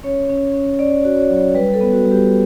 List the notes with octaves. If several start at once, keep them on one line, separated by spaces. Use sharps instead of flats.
C#4 C#5
C#4
C#4
C#5
C#4 D5
C#5
F#4
C#5
F#3
C#5
G3 B4
A4
B3
F#4
G3
G4